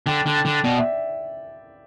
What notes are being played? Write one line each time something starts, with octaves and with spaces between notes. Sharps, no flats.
D3 G5
D3
G5
D3
B2 D5
E5